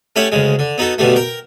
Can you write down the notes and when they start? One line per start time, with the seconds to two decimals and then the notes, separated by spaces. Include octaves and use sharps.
0.16 A3 C#4 G4 E5 F#5
0.32 D2 C#3 G#3
0.59 D3
0.78 B3 D#4 F#4 A4
0.98 B1 B2 D3 G3 A3
1.16 A#4 G5